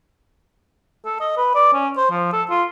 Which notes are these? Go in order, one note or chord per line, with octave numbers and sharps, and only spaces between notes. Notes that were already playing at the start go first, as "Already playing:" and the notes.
A4
D#5
B4
D5
C#4
C5
F3
A4
F4